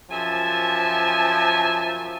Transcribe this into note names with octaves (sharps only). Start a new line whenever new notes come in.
F#2 F3 E5 G#5 A5